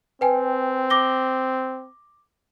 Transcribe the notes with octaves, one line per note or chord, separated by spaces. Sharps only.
C4 B4 G5 G#5
D6 A#6 G7